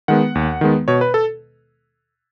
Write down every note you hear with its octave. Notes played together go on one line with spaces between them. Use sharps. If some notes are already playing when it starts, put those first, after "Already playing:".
D#3 G#3 B3 F#5
D#2
D#3 G#3 B3
B2 C#5
B4
A4